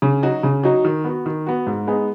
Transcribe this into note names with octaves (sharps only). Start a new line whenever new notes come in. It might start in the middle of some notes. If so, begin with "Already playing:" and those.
C#3
F#3 D#4 F#4
C#3
F#3 D#4 F#4
D#3
B3 F#4
D#3
B3 F#4
G#2
G#3 B3 D#4 G#4